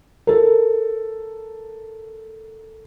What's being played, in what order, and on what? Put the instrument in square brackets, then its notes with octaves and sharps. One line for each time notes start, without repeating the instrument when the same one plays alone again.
[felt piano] A4 A#4